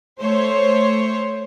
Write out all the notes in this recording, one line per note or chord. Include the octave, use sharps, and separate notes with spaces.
A3 C5 C#5